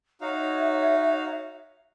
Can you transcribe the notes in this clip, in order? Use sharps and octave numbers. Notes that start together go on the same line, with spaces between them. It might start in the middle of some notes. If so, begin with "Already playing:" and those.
D#4 F#4 C#5 E5 F5